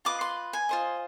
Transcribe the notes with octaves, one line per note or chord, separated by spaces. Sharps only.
F4 B4 D#5 D6
C6
G#5
F4 C5 D#5